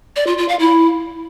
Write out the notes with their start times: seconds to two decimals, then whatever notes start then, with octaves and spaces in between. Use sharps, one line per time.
0.16 D5
0.27 F4
0.38 F4
0.48 F5
0.59 E4